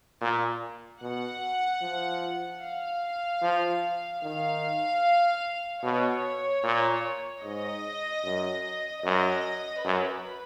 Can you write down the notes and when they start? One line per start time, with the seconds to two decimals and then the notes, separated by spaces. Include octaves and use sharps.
0.21 A#2
1.01 B2 F#5
1.82 F3
2.61 F5
3.42 F3
4.22 D#3 F5
5.83 B2 C#5
6.63 A#2
7.44 G#2 D#5
8.24 F#2
9.04 F#2 D#5
9.84 F#2 B4